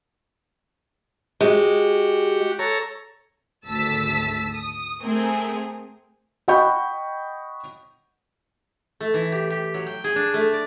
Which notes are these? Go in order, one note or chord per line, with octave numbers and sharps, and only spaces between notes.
G#3 F#4 G4
A4 C#5 A#5
G#1 D2 A3 A5 E6 B6
D#6
A3 C4 G#4 A#4
D#5 F#5 G5 B5 C#6 G6
A3
E3
G4
G4
F#3
G5
G#4
D4
A3
D5